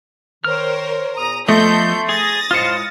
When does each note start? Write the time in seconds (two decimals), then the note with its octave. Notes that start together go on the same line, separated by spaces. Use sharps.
0.44 D#3 A#4 C5 C#5 F6
1.17 E2 A#2 A#5 D#6
1.48 F3 A3 B3 A4 D#5 A5 C6 G6
2.09 G#4 D#6 A6 A#6
2.51 A2 G#3 F4 C5 F6 C#7